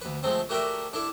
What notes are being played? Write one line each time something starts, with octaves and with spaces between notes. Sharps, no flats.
D2 B4
F3 G#3 A3 C4
A3 F#4 G4 A#4 D5 E5
D4 E4 A4 D5